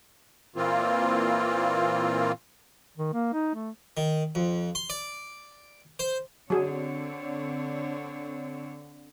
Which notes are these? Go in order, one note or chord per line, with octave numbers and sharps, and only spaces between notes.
A#2 E3 A#3 C4 F4
D#3
A#3
D#4
A3
D#3
F2
C6
D5
C5
D3 F#3 C4 G#4 C#5